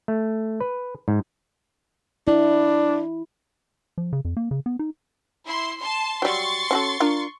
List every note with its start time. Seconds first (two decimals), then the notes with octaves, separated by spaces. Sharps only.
0.08 A3
0.60 B4
1.08 G#2
2.28 D4 E4
3.98 F3
4.13 C#3
4.25 F2
4.37 A#3
4.51 C#3
4.66 B3
4.79 D#4
5.44 E4 C6
5.79 A5 C6
6.22 F#3 G3 C6 C#6 A6
6.71 C#4 F#4 A4
7.00 D4 F4 A#4